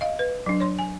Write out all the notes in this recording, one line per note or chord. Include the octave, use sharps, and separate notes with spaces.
D#5 F5
B4
F#3 D4
C#5 C6
G#5